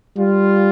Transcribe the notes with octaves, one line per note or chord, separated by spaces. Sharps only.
G3 F4